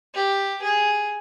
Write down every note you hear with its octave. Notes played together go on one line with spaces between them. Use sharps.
G4
G#4